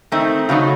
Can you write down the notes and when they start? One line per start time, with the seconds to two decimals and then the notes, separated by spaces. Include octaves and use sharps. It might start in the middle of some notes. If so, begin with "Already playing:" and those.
0.12 D#3 A3 C4 D#4
0.49 C#3 F#3 A3 D#4